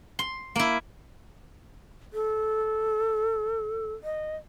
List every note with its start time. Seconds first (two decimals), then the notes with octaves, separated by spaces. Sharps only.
0.19 C6
0.55 A#3 E4
2.13 A4
4.04 D#5